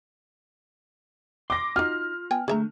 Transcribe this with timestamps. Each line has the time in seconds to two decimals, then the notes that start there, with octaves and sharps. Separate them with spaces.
1.50 C6 D6 A#6
1.76 D#4 F4 F#4 F6
2.31 B3 G5 G#5
2.48 D3 A3 G#4 E5 A#5